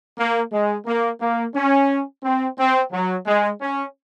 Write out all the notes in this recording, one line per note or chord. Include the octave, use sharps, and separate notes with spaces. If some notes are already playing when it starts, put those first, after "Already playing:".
A#3
G#3
A#3
A#3
C#4
C4
C4
F#3
G#3
C#4